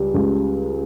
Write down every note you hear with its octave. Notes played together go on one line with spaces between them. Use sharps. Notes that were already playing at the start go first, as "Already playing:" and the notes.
Already playing: C#2 C#3 G3
C#2